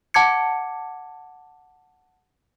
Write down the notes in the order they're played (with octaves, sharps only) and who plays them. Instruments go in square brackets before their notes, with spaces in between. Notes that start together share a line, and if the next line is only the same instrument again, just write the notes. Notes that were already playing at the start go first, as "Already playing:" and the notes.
[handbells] F#5 A5 D6 G#6 C#7